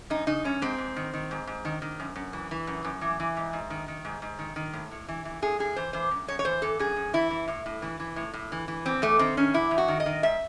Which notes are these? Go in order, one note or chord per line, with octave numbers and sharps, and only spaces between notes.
F#2 D#4
C#3 D#4
F#2 C#4
G#2 C4
G#2
D#3
D#3
G#2
G#2
D#3
D#3
F#2
F#2
E3
E3
F#2
F#2
E3
E3
G#2
G#2
D#3
D#3
G#2
G#2
D#3
D#3
A2
A2
E3
E3
A2 G#4
A2 G#4
E3 C5
E3 C5
F#2
F#2 C#5
C#5
E3 C5
E3 A4
F#2 G#4
F#2
E3 E4
E3
A2
A2
E3
E3
A2
A2
E3
E3
E2 C4
E2 A3
D#3 C4
D#3 C#4
E2 E4
E2
F#4
D#3
D#5
D#3
G#2 E5